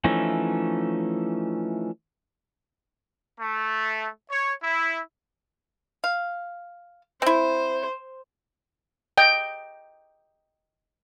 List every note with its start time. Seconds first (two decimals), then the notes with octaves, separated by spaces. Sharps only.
0.04 E3 F3 A3 C#4 D#4
3.40 A3
4.31 C#5
4.62 E4
6.04 F5
7.22 C4 E4 C5
9.18 D#5 G5